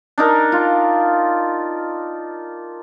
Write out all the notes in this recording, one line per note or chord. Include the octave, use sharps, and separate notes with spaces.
D4 D#4 A#4
F4